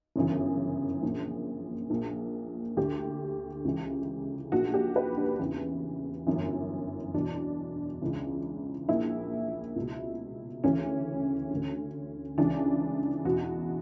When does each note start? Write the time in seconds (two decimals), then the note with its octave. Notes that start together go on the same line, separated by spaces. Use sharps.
0.16 G1 F#2 C#3 E3
1.03 A#1 A#2
1.90 A#1 A#2
2.77 D2 D3 G4
3.65 C#2 C#3 E3
4.52 A#1 A#2 F#4
4.74 G4
4.96 B4
5.17 D4
5.39 E2 C#3 E3
6.27 G1 F#2 E3
7.14 E2 B2 D4
8.02 C#2 C#3 E3
8.89 A#1 A#2 E4
9.76 C#2 B2
10.64 D2 C#3 E3 C#4
11.51 D2 D3
12.38 C#2 C#3 E3 D4
13.25 E2 B2 F#4